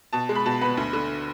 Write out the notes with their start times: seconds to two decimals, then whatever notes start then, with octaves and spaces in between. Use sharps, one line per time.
0.13 B2 A5
0.29 G#3
0.35 B5
0.46 B2 A5
0.61 B3 B5
0.77 D2
0.93 D3